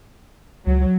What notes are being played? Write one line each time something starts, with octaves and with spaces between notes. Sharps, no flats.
C#2 F#3